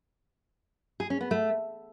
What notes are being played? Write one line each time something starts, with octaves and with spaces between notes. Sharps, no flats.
G#4
C#4
B3
A3